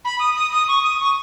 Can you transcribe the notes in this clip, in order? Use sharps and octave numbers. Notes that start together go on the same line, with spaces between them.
B5
D#6
D#6
D#6
C#6
D#6
C#6